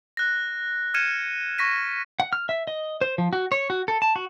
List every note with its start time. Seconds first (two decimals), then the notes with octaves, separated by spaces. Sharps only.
0.17 F#6 A#6
0.94 F6 G#6 C#7 D#7 E7
1.58 C#6 A#6 B6 D#7
2.20 F#5
2.33 F6
2.49 E5
2.67 D#5
3.01 C5
3.18 F3
3.33 F#4
3.52 C#5
3.70 F#4
3.88 A4
4.02 A5
4.16 F#4